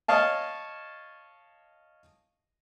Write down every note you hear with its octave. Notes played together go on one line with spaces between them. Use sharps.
C#5 D#5 F5 A5